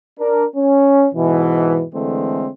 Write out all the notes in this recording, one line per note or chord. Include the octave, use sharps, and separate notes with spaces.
D4 A#4
C#4
G#2 B2 E3
D3 E3 G#3 A3 C4